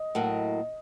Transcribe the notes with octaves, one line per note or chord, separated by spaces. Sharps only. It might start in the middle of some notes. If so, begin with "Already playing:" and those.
Already playing: D#5
A2 F#3 A#3